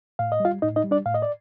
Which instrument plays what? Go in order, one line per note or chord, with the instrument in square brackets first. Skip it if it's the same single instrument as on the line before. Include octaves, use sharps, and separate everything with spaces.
[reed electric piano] A2 F5
D#5
G3 F4 F5
A2 D#4 D#5
D#4 D#5
G3
D4 D5
A2 F5
D#5
D5